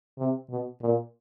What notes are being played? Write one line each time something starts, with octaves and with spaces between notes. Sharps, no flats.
C3
B2
A#2